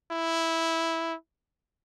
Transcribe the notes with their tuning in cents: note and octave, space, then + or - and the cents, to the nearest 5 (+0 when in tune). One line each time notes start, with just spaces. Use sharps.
E4 -5